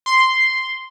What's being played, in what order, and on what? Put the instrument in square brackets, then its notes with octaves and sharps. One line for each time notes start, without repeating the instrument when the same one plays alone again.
[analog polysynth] C6